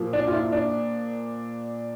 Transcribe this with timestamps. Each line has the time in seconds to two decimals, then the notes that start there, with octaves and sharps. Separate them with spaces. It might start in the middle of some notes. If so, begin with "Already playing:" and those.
Already playing: A#2 F3 A#3
0.13 D4
0.27 F4
0.32 E4
0.52 D4